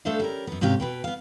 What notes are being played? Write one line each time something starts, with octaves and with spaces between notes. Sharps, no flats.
A3 D4 A4 C5 E5 F5
G3 C#4 A#4
F#2 B3
G#2 C3 C#4 G4 F5
B2 B4 G5
B3 F5